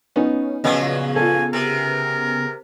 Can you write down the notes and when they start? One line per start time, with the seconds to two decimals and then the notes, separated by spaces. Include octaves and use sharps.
0.16 B3 C#4 D#4
0.64 A#2 C#3 F3 F#3 B3 G#4 D#5
1.16 F4 A4 G#5
1.53 C3 A#4